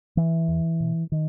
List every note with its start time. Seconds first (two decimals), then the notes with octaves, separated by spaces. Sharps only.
0.17 E3
0.48 E2
0.80 B2
1.12 D#3